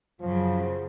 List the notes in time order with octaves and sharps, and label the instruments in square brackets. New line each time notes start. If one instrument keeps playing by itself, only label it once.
[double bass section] F#2 [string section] C#3 F#3 [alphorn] F3